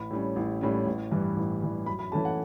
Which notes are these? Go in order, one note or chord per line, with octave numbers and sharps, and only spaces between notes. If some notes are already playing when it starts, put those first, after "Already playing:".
Already playing: A1 B5
A2 G3 C#4
A1
A2 G3 C#4
A1
G2 E3 G3
A1
G2 E3 G3
F#2 B5
B5
E3 A3 C#4 A5
F#5